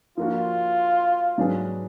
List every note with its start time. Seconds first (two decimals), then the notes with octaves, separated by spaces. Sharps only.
0.17 F3 A#3 D4 F4 F#4
1.38 G#2 F#3 D4 G#4 B4